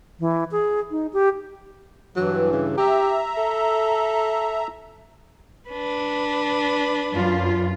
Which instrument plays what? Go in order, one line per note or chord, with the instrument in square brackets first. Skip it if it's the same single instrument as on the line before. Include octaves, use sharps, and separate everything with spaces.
[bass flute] E3
G#4
D#4
G4
[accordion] G2 E3 [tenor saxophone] F#3
[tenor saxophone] C#3
[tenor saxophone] G4 [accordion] E5 A#5
[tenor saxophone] A4
[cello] D4 B4
[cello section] F#2 F4